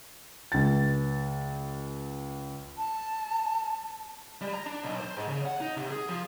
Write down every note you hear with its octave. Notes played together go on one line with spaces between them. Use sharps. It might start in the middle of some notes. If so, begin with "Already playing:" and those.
C#2 A6
A5
G3
A#5
D4
B1
C5
G#2
C#3
F#5
D#4
C3
G#4
F3